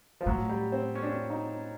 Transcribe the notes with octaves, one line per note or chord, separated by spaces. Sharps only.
F3
A2 F#3
G3
C4
C#4
D4
C#4
D#4